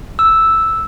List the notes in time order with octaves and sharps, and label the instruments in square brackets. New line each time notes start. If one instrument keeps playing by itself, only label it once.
[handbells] E6